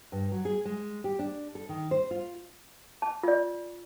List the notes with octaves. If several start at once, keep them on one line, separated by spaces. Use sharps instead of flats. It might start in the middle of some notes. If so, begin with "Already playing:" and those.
G2
F#3
G#4
G#3
G4
D4
A4
D#3
C5
F4
A5
F4 D5